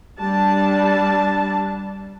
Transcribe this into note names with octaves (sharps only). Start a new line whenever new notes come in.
G3 D4 A5